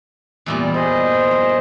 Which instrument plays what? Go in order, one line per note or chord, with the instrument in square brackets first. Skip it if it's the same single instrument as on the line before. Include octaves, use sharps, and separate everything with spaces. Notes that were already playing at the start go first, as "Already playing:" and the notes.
[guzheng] E2 A#2 G3
[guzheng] G3 [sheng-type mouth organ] G#4 C5 D#5
[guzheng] F3